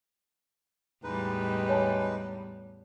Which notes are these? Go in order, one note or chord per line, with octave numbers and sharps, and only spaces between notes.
E2 A2 G3 G#3 D#4 B4
C#5 G#5 A5